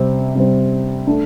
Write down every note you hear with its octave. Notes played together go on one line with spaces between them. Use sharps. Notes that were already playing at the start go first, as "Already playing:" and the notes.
Already playing: C3 G3 C4
C3 G3 C4
A3 D4